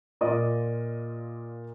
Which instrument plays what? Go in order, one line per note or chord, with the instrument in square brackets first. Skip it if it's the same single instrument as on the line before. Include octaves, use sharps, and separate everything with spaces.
[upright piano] A#2 F4 D5 D#5 D#6